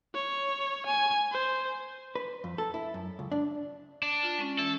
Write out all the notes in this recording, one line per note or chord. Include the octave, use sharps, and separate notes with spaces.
C#5
G#5
C5
B4
F2
A4
E4
F#2
C#2
D4
D4
F4
G#3 C#4
E3 A4